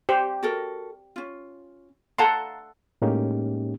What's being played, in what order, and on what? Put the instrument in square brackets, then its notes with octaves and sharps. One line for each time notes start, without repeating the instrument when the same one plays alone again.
[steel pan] G4 C5
[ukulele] F#4 A4 A#4
C#4 F4
[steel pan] A4 F#5 C6 [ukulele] F5 A5 A#5
[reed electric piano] A2 G#3 A#3 C#4 D#4 G4